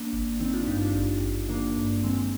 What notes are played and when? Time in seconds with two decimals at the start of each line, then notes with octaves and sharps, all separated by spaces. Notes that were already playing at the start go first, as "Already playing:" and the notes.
Already playing: A#3 D4
0.13 G#1
0.40 D#3 C4 D#4
0.54 D4 F4
0.67 G2 D#4 G4
0.81 D4 F4
0.94 G#1
1.22 G#1
1.49 D#3 A#3 D4
1.76 G2
2.03 D#3 G#3 C4